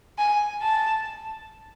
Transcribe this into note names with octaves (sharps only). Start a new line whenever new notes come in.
G#5
A5